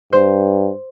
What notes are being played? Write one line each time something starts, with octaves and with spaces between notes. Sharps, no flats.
G2 C5